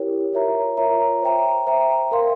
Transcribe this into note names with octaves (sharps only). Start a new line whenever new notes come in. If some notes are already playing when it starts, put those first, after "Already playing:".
Already playing: E4 G4 A#4 C#5 G5
F4 A#4 C#5 E5 A#5
F4 A#4 C#5 E5 A#5
C5 E5 G5 A#5
C5 E5 G5 A#5
A#4 F5 C6